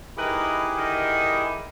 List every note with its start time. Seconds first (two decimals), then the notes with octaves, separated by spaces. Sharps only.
0.17 D#4 E4 G4 G#4 A#4 B4
0.77 D3 D#3